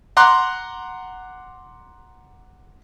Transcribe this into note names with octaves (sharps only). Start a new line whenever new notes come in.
F#5 A#5 C6 D6 F#6